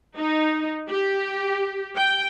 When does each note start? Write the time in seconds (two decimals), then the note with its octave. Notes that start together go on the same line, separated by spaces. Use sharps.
0.18 D#4
0.89 G4
1.96 G5